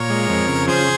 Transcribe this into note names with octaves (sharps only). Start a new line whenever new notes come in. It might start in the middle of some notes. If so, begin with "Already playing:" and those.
Already playing: A#2 A#4 C#5
G#3
F2
C#3
F3 G#4 C5